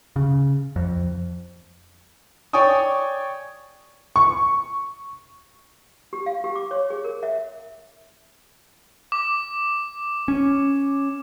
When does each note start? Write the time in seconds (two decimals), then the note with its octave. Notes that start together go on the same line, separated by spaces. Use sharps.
0.16 C#3
0.76 F2
2.53 C#5 D5 G5 G#5 C#6 D#6
4.16 C#6
6.13 G4
6.26 F5
6.44 G4
6.55 D6
6.71 C#5
6.90 G#4
7.04 A#4
7.23 E5
9.12 D6
10.28 C#4